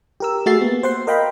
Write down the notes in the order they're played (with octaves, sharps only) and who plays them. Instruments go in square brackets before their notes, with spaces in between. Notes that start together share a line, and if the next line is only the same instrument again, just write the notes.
[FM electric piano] G4 A#4 E6
A3 F#4 G#4 E5 A6 C7
A#3 B3
C5 F#5 C6
A#4 D#5 F5 G5 A#5 B5